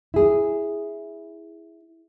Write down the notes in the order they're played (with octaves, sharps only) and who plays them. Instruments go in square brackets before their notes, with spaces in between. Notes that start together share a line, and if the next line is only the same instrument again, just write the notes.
[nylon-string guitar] E4 G#4